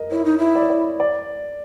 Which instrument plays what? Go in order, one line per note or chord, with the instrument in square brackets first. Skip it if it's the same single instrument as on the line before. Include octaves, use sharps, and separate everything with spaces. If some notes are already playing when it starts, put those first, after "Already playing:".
Already playing: [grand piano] A#4 D#5
[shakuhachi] E4 [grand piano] C#5
[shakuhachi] D#4
E4
[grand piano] D5
C#5
D5
D5